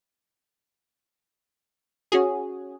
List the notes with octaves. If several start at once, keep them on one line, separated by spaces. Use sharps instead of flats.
C#4 F#4 G#4